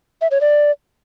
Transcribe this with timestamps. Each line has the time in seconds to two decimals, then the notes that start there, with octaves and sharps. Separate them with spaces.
0.21 E5
0.31 C#5
0.41 D5